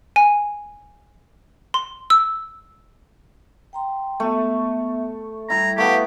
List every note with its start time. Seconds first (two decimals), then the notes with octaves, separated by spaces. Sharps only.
0.16 G#5
1.74 C6
2.10 E6
3.73 G5 A#5 C6
4.20 A3 B3 E5
5.50 G3 E4 A#5
5.78 A3 B3 G4 F5 A#5